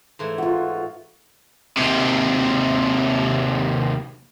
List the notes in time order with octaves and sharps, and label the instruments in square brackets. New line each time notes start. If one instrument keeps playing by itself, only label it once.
[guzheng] G#2 E3 A3
[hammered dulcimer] F4 F#4
[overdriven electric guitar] D#2 C3